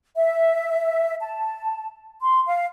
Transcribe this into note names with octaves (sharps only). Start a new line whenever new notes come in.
E5
A5
C6
F5